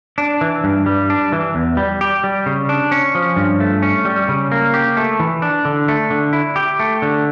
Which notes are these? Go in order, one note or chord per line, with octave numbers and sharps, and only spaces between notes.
D4
E3
G2
G3
D4
E3
E2
G3
G4
G3
C#3
D4
C#4
F3
G2
A3
C#4
G3
C#3
A#3
G4
A3
E3
D4
D3
A3
D3
E4
G4
A3
D3